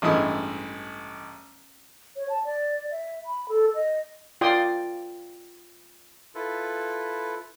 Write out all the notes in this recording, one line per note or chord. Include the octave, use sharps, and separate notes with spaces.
A1 G2 G#3 E4 D#6
C#5
A5
D5
E5
B5
A4
D#5
F4 D5 G5 C6 D#6
E4 F4 A4 B4